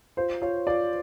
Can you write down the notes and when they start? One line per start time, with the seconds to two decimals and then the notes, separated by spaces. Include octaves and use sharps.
0.17 F4 C5
0.42 F4 C#5
0.67 F4 D5